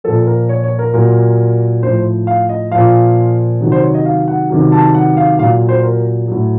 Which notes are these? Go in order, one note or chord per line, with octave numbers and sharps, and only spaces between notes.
A#2 F3 A4
A#4
C#5
C#5
A#4
A#2 F#3 A#4
A2 F3 C5
F5
D#5
A#2 F3 F5
C3 D#3 F#3
C5
C#5
D#5
F5
F#5
C3 D#3 F#3
A5
F#5
F5
A#2 F#3 F5
C5
A#4
A2 F#3